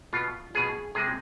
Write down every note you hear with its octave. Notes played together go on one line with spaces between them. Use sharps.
B2 B3 F4
B2 B3 F4 G#4
C3 G#3 C4 G#4